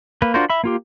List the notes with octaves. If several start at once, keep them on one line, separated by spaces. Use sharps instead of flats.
A#3 B4
D4 F4 F#4 A#4 C5
E5 B5
A#3 F4 G4